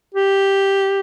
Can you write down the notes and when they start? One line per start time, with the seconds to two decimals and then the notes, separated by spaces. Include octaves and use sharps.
0.15 G4